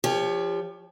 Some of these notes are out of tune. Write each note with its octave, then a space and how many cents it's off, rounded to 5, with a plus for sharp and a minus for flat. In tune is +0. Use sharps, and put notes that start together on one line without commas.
F3 -10 G4 +35 C#5 +20